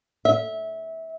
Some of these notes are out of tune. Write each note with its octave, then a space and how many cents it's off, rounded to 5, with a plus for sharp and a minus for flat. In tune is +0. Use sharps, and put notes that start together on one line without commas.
E5 -20